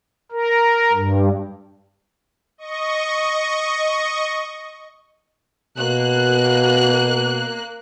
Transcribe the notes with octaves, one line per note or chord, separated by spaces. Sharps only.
A#4
G2
D#5 C#6
B2 A#3 F#6